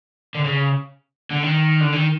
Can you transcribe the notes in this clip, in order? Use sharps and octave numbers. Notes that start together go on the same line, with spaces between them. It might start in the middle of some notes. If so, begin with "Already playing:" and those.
D3
C#3
D3
D#3
D3
D#3